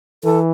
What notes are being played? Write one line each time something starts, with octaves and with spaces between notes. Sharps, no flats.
E3 A4